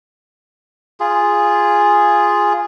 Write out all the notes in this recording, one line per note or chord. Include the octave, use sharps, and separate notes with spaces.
F4 G#4